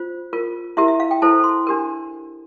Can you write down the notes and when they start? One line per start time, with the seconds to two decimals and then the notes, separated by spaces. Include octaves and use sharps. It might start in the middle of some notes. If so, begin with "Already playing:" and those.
Already playing: F4 C5
0.33 F4 A#4
0.77 E4 G4 A#4 E5
0.88 E5
1.00 F5
1.11 G5
1.22 E4 A4 C5 A5
1.44 C6
1.67 D4 G4 A#4